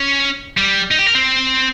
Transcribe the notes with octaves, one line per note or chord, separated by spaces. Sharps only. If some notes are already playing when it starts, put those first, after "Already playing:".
Already playing: C#4
G3
D#4
G4
A#4
C4